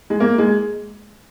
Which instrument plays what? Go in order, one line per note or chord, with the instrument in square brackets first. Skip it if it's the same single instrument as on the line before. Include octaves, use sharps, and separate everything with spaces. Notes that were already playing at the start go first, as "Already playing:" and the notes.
[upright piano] G#3
A#3
G#3